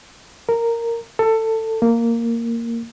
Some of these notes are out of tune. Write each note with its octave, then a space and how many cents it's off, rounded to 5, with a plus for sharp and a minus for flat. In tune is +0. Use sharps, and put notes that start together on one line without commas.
A#4 -10
A4 +20
A#3 -10